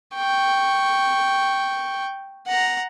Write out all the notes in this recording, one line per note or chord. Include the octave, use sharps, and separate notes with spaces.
G5 C#6
F#5 A#5